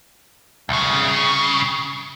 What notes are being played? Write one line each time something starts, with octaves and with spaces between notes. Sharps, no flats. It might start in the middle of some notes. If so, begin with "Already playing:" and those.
C2 C#3